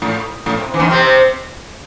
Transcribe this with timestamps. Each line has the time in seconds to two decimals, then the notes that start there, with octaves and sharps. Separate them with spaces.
0.02 A2
0.46 A2
0.57 C3
0.74 E3
0.80 D#2 D#3
0.91 C3 C4